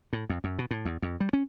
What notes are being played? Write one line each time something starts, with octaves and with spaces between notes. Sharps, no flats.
A2
F2
F#2
B2
A2
E2
F2
G3
C#4